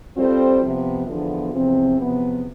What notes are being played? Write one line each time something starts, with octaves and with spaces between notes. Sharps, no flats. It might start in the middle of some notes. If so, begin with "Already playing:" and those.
G3 C4 F4 A4 C5
C3 F3 B3
E2 D3 F3 B3 F4
E2 C3 F3 C4
E2 C3 F3 B3